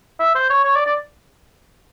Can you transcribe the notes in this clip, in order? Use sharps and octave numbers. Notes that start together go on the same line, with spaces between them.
E5
C5
C#5
C#5
D5
D5